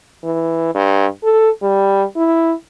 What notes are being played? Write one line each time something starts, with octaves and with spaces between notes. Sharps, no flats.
E3
G2
A4
G3
E4